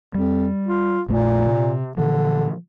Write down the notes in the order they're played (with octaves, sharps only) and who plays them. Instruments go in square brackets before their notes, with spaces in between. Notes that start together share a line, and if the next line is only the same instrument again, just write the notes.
[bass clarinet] F2 [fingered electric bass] G3
[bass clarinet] F4
[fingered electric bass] A#1 F2 A3 [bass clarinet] A#2
[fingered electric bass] C3
[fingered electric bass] A#2 E3 F3 [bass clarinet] D3